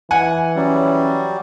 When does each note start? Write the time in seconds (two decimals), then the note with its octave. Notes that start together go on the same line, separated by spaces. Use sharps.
0.11 E3 F#5 G#5
0.56 F#3 G3 C#4